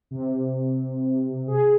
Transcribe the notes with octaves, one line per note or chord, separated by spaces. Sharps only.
C3
G#4